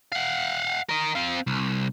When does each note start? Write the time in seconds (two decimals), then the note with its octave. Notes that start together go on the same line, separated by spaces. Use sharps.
0.12 F5 F#5
0.89 A#4 D#5
1.16 C4 F5
1.47 C2